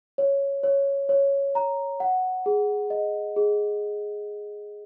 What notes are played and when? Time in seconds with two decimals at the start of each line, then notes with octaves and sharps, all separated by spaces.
0.18 C#5
0.63 C#5
1.09 C#5
1.55 A#5
2.00 F#5
2.46 G#4
2.90 D#5
3.36 G#4